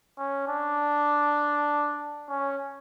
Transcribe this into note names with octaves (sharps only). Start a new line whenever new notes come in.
C#4
D4
C#4